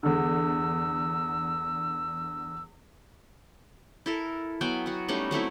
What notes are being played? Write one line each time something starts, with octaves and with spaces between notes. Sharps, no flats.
E2 D3 E6
E4 A4 A#4
F#3 B3 G5 G#5
F#3 F#4
G3 A3 C#4 D#4
F#3 A3 C4 E4